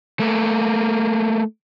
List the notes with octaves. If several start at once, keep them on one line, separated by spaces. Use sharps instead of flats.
A3 A#3